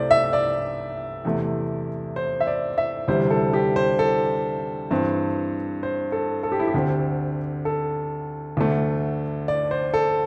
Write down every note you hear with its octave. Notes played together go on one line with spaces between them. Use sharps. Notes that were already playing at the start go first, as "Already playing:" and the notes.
Already playing: C2 C3 A3 C5 D5
E5
D5
E2 C3 A3
C5
E5
D5
E5
D2 C3 E3 G3 C5
A4
G4
C5
A4
G2 E3 C4
C5
A4
A4
G4
E4
G4
D2 D3 C4
A4
D2 D3 A3
D5
C5
A4